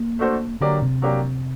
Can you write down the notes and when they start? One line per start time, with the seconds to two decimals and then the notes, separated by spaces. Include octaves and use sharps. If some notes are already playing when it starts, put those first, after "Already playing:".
Already playing: A#3
0.19 A3 D4 F#4 A4 C5
0.61 D3 F#3 A#3 D4 G4 D5
0.82 C3
1.02 F#3 A#3 D4 G4 D5